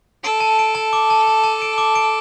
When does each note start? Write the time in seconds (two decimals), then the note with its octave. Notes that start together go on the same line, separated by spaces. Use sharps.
0.24 A4 D7
0.40 A5
0.59 D7
0.75 A5
0.93 D6
1.10 A5
1.27 A5
1.44 A5
1.62 D7
1.78 D6
1.95 D7